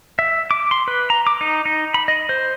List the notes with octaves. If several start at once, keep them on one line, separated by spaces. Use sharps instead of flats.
E5
D6
C6
B4
A#5
D6
D#4
D#4
B5
D#5
C5